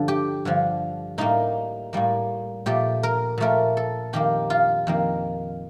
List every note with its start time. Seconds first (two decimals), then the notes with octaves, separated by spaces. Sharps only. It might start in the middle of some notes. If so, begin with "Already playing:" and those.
Already playing: G2 D3 F3 A4
0.08 G4
0.45 G2 D3 F3
1.18 A2 G3 A#3 D#4
1.93 A2 G3 A#3
2.66 A#2 F3 A3 G4
3.03 A#4
3.38 A#2 F3 A3 A#4
3.77 A4
4.13 F2 D#3 A#3 G4
4.50 F4
4.87 F2 D#3 A#3